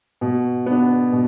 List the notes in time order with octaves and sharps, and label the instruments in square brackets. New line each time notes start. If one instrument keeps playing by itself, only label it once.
[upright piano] B2
B3 D4
B2